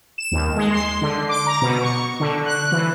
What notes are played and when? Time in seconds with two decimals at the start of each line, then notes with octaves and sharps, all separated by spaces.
0.18 E7
0.32 D#2
0.56 G#3
0.71 C6
1.01 D3
1.29 D6
1.46 A#5
1.62 B2
1.81 C#6
2.20 D3
2.46 F#6
2.72 E3